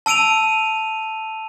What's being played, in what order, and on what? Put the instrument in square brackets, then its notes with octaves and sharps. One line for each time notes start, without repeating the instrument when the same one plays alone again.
[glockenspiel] A5 E6 D7 D#7 F7